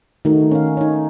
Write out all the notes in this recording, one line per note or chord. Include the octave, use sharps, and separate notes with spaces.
D#3 A3 D#4 F#4
C#4 F5
D#4 C#5